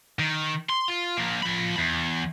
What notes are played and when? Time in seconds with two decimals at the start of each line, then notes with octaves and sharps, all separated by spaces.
0.19 D#3
0.70 C6
0.88 F4
1.17 F3 A#3
1.43 F3 B5
1.77 E2